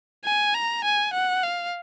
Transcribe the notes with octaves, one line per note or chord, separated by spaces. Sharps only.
G#5
A#5
G#5
F#5
F5